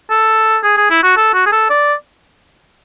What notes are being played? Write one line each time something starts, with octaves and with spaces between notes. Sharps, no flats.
A4
G#4
G#4
E4
F#4
A4
F#4
G#4
A4
D5